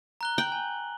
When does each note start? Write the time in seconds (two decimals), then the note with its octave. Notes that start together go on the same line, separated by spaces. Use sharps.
0.21 A#5 F#6 G7
0.38 G5 F#7
0.52 G#5